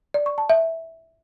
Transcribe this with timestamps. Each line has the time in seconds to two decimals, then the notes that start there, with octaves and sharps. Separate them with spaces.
0.14 D5
0.26 C#6
0.38 A5
0.50 E5